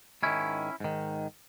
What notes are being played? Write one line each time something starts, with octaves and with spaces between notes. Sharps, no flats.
G#2 D#3 C#4 E4
G#2 D#3